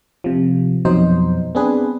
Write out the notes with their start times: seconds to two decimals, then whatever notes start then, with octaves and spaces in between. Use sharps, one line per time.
0.24 C3 F3
0.85 F2 B2 F#3 D#4 C5
1.55 B3 C4 D4 G#4 B4